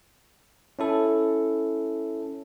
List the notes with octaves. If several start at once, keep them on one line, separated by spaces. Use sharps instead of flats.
C#4 E4 A4